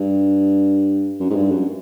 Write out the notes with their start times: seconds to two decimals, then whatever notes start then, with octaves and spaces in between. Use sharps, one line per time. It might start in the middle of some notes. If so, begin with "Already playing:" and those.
Already playing: G2
1.19 F#2
1.30 G#2
1.36 G2
1.51 F#2